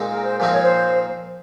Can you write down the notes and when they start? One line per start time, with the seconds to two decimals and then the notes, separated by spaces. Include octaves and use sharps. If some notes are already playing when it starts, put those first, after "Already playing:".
Already playing: A#2 G#3 C4 D#4
0.09 A#4
0.25 C5
0.40 A#2 F3 C4 D#4 C5
0.51 C#5
0.62 C5